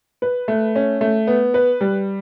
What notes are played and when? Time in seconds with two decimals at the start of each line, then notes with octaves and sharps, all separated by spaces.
0.22 B4
0.48 A3
0.75 C#4
1.01 A3
1.27 B3
1.54 B4
1.81 G3